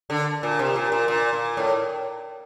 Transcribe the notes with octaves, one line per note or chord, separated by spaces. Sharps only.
D3
A#2
C3
A#2
A#2
A#2
A#2
A2